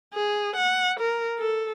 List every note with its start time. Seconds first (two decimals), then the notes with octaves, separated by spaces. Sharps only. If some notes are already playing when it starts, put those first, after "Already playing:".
0.13 G#4
0.56 F#5
1.00 A#4
1.38 A4